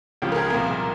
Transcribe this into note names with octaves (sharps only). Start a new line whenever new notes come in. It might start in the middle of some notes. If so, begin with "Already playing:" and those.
C#2 C#3 F3 G4
A#4
G#4
C2 A#2 F3 A#4